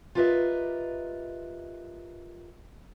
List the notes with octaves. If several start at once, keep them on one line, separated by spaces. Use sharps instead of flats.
F4 G4 A#4 B4 D#5 E5